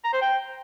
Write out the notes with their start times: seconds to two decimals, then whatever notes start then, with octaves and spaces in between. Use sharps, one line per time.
0.05 A#5
0.13 C5
0.22 G5